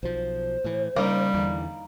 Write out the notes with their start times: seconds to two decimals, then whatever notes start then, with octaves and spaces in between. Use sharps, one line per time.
0.03 B1 F3 C5
0.64 A2 E3
0.96 C#3 G3 A#3 D#4
1.34 E2 D3 E3